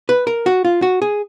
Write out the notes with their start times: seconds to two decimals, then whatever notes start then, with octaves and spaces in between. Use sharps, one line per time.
0.09 B4
0.27 A#4
0.46 F#4
0.65 F4
0.82 F#4
1.02 G#4